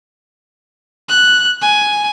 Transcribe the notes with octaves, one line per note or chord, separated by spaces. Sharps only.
F#6
G#5